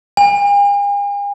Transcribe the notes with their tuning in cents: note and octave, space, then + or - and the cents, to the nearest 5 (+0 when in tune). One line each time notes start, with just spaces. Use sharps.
G#5 -45